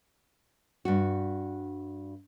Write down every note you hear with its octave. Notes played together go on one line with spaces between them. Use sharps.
G2 F#4